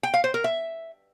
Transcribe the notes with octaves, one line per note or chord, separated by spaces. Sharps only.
G5
F5
C5
A#4
E5